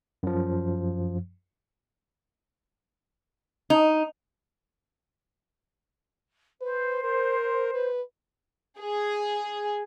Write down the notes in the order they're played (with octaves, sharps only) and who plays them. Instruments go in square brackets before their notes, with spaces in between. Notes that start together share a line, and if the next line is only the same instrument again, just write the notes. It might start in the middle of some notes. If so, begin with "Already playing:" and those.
[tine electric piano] F#2 F3
[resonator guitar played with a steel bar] D#4
[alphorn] B4 [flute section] C5
[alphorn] A#4
B4
[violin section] G#4